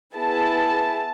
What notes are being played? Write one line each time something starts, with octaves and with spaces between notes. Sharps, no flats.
B3 E4 G#4 A5